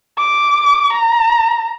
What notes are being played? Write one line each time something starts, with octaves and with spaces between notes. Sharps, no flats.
D6
A#5